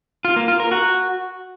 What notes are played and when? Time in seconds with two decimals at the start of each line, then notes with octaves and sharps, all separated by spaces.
0.25 F4
0.36 A#3
0.48 F4
0.60 A#4
0.71 F#4